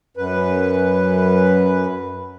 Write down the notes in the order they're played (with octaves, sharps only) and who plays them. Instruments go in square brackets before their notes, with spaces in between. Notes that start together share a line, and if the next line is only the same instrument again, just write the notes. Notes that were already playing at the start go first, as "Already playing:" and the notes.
[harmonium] F#2 B4